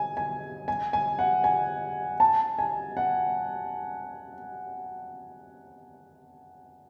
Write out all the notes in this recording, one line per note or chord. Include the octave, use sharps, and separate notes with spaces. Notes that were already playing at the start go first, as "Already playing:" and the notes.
Already playing: G#5
G#5
G#5
G#5
F#5
G#5
A5
G#5
F#5